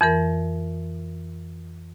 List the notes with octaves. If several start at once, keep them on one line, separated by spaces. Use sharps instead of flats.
F2 E3 A#4